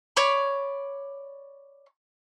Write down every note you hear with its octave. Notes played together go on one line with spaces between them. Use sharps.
C#5 D5 B5